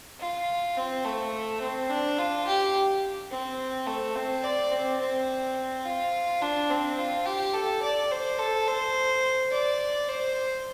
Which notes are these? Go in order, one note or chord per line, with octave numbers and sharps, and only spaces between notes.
F4
C4
A3
C4
D4
F4
G4
C4
A3
C4
D5
C4
C4
F4
D4
C4
F4
G4
A4
D5
C5
A4
C5
D5
C5